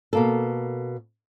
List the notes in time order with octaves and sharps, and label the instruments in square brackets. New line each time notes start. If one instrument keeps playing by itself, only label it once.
[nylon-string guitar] B2 A#3 A4